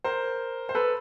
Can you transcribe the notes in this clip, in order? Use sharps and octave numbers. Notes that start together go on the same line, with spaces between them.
A#4 C5
C5
A4 B4